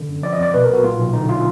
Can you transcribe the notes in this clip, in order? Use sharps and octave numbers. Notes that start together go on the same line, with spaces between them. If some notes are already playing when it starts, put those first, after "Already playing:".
Already playing: D3
F#2
F3 D5
D#5
F2
D5
B2 B4
B1 A#4
F#4
A#2 F4
B1
D3 D#4
F4